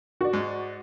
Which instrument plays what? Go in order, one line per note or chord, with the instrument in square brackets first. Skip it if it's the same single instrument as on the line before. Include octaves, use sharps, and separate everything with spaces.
[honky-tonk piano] F#4 D5
[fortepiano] G#2